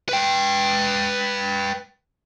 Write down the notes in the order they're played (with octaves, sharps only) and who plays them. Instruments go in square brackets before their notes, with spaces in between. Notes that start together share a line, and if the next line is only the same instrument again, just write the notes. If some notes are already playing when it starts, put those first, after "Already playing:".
[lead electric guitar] B4 G5